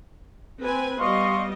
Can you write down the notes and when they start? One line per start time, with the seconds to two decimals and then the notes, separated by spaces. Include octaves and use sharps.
0.60 C4 B4 G#5
0.99 G3 B3 D#5 F5 C6 C#6